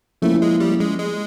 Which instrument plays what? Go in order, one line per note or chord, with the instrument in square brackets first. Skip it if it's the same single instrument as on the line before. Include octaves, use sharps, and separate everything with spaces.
[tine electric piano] F3 A#3 C#4 E4 [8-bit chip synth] A3
[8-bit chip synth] G#3
G3
G#3
G#3